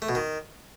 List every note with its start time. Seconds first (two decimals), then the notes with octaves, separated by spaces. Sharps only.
0.02 A3
0.09 B2
0.15 D#3